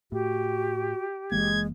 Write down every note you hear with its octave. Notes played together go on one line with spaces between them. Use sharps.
A2 F#4 G4
F#1 E3 G#3 A#3 G#6